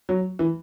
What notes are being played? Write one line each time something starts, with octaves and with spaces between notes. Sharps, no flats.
F#3
E3